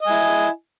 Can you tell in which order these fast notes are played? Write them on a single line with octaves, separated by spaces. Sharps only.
D#5 G#5 E4